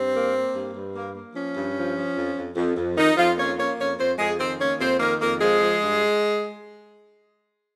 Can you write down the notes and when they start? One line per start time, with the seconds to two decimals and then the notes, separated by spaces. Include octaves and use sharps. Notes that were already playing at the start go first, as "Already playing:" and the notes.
Already playing: G2 C4
0.14 A#3
0.34 A#3
0.55 G2
0.74 G2
0.95 A#3
1.15 A#3
1.35 F3 C#4
1.56 G2
1.76 F3
1.96 F3
2.17 F2
2.36 F2
2.56 F2
2.77 F2
2.97 F2 D#3 D#4
3.17 F2 F3 F4
3.38 A#3 C#4 C#5
3.58 A#3 C#4 C#5
3.78 F2 C#4 C#5
3.98 F2 C4 C5
4.18 F2 G#3 G#4
4.39 D#3 C4 C5
4.59 A#3 C#4 C#5
4.80 F2 C4 C5
5.00 D#3 A#3 A#4
5.20 F2 A#3 A#4
5.40 F3 G#3 G#4
5.60 F3
5.81 G2